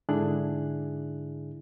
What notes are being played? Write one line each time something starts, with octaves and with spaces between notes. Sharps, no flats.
G#2 D3 D4 E4 G#4 F#6